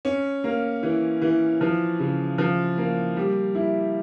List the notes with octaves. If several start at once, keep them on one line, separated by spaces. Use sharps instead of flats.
C#4
A#3
E3
E3
F3
C#3
F3
A#3
G3
E4